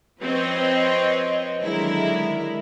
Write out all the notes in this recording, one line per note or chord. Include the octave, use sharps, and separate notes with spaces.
F3 C4 B4 C#5 D#5
D3 D#3 F#3 G#3 E4 A#4